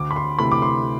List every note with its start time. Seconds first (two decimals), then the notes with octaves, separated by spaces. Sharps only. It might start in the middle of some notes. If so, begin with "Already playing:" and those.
Already playing: D2 D6
0.11 B5
0.16 C6
0.39 C3 E3 A3 B5
0.52 D6
0.62 C6